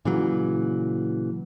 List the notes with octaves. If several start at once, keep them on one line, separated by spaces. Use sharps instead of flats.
A#2 C#3 E3 F#3